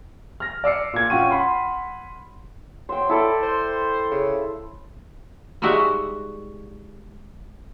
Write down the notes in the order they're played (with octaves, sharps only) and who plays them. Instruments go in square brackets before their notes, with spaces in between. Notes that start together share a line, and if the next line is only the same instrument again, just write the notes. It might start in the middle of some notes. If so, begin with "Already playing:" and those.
[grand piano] F6 A#6
D5 E6 C7 C#7
A#2 G#6
C#4 F4 F#5 G5 C#6 D#7
F#5 B5 C6
[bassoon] F#3 [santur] C5 G5
[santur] E4 A4 D5
[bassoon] C5
C#3
[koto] G3 G#3 D#4 F#4 E5 F#5